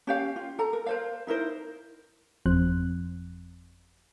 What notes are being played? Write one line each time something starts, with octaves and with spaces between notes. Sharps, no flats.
C#4 G4 F5
F4
A4 A#5
A#4
A#4 C5 F5
D#4 E4 A#4 C5
G1 F2 F3 C4 F#6